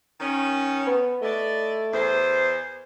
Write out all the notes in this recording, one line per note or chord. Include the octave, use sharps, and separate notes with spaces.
D#3 C#4
B3
A3 E4 D5 D#5
E2 C5